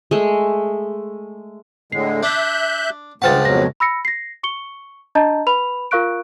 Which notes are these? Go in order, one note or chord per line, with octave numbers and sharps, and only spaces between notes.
G#3 A3
A2 D3 G#3 C7
D4 E5 F#6 G6
C#2 G2 F3 F#5 G5 A5 A6
F2 B2 F#3 A#6
B5 E6 A#6 C#7
A#6 C7
C#6 C#7 G7
D4 D#5 A5 A#5 G6
B4 B5 F7
F4 A#4 F5 C#6 F#6 D7